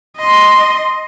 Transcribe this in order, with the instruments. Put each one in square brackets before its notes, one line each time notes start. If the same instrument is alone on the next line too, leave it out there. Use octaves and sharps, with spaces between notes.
[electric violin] D#5 C6